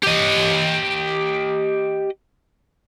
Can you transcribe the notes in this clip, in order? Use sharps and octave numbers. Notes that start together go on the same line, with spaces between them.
G4 D#5